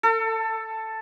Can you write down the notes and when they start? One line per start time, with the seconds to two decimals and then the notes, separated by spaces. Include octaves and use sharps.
0.03 A4